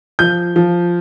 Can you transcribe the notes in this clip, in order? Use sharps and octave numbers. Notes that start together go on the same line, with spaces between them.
F3 G6
F3